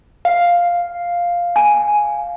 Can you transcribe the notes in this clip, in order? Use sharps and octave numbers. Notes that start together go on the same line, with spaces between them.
F5
G#5